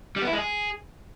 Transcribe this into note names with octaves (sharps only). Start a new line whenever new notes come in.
G3
B3
E4
G#3
G#4